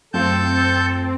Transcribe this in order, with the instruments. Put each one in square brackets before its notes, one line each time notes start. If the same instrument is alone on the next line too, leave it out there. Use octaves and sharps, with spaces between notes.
[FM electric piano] F#2 A3 F4 [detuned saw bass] C4 [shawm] A4 [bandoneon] A5 G6